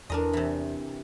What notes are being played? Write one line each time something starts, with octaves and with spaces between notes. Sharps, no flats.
E2 D4 A#4 D#5
C3 E3